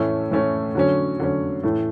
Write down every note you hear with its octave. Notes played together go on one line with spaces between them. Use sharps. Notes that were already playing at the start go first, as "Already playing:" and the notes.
Already playing: A2 E3 A3 C#4 E4
A2 E3 A3 C#4 E4
D3 F#3 C#4
D3 F#3 C#4
A2 E3 A3